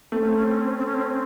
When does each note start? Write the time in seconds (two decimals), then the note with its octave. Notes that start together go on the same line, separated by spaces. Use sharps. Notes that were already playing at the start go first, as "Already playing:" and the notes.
0.12 A3 C4
0.20 C#4
0.28 C4
0.36 C#4
0.44 C4
0.54 C#4
0.61 C4
0.70 C#4
0.78 C4
0.86 C#4
0.94 C4
1.02 C#4
1.10 C4